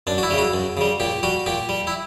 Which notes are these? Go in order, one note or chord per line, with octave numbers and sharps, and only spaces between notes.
F#2 D4
F#4
E4
C#3 G3
F#4
F#2
C#3 G3
A#2 G4
G3 F#4
A#2 G4
G3
E4